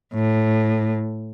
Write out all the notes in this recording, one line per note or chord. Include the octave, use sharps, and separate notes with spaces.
A2